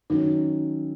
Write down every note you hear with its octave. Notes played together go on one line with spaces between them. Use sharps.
D#3 F#3 C#4 D#4